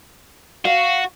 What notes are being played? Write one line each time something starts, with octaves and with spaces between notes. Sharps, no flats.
F#4 F5